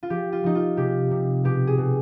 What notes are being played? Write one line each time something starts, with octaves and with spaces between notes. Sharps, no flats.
F4
F3 G4
F4
F3 D#4
F4
C3 G4
C3
B2 G4
G#4
B2